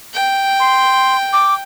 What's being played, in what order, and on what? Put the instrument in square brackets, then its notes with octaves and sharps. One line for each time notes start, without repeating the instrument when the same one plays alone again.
[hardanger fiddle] G5
[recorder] C6
D6